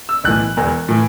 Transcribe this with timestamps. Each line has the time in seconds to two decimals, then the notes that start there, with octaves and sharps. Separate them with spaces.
0.09 E6
0.24 B1 A2 E3 F#6
0.57 E1 E2 E3
0.88 A2 E3